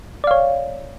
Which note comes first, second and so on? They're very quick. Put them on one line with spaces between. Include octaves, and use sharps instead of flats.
D5 F5 C#5